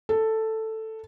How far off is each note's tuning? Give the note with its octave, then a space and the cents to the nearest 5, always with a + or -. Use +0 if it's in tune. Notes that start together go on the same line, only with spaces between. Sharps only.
A4 +5